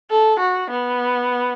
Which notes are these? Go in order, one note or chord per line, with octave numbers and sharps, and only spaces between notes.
A4
F#4
B3